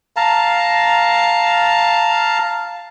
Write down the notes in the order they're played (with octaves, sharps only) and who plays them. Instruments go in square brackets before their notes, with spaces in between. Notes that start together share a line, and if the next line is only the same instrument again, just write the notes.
[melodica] F5 A5 A#5